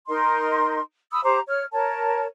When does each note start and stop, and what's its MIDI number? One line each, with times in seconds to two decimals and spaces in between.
0.08 0.80 63
0.08 0.80 70
0.08 0.80 75
0.08 0.80 84
1.12 1.21 83
1.12 1.21 87
1.12 1.21 88
1.24 1.39 67
1.24 1.39 72
1.24 1.39 82
1.24 1.39 86
1.48 1.64 73
1.48 1.64 89
1.72 2.25 70
1.72 2.25 73
1.72 2.25 81